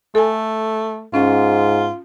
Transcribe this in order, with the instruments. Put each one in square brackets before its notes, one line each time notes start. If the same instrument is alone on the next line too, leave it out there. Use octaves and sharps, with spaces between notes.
[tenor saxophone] A3 [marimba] A4 G#5
[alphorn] G#2 [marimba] C#4 [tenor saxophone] F4